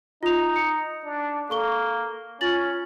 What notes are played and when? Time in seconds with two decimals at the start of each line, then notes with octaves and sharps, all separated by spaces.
0.23 D#4 F4 F7
0.56 C#7
1.05 D4
1.50 A#3 A4 C#6 G7
2.41 C#4 F4 A6 F#7